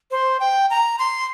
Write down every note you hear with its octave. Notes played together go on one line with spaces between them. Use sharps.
C5
G5
A#5
C6